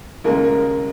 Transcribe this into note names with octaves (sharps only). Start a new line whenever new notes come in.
D#2 C#3 G#3 A#4
A#4